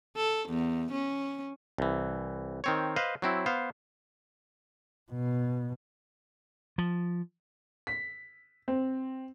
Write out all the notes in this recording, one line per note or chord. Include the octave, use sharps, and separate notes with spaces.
A4
E2
C#4
C2 E3
D#3 C4 C#5
B4 C5 D#5 F5
F#3 C4 E4
B3 C5 F5
B2
F3
B6
C4